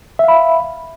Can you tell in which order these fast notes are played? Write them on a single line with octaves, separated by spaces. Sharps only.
E5 F5 B5